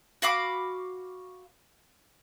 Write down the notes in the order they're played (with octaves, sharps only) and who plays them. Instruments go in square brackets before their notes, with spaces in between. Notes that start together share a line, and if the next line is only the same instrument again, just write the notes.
[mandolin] F#4 F5 B5 D6